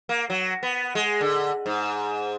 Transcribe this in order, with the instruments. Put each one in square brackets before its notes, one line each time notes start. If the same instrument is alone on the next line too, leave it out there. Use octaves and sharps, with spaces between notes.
[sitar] A#3
F#3
B3
G#3
D3
G#2